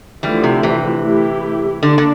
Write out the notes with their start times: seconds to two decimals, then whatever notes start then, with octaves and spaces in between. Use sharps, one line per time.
0.23 D3 E3 F3 G3 A3 E4 G4
0.44 C3
0.63 C3 E3
1.03 A3 E4 G4
1.83 D3 A#3 D4
1.98 D3